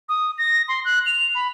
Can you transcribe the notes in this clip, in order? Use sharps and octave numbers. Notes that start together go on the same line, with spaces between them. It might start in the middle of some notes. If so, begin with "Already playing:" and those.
D#6
A#6
C6
F#6
F7
B5